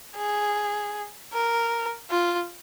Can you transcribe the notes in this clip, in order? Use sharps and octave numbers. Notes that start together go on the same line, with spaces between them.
G#4
A#4
F4